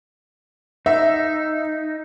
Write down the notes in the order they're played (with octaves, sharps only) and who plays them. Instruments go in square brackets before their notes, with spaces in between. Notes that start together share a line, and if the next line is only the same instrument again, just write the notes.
[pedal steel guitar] D#4 [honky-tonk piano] E5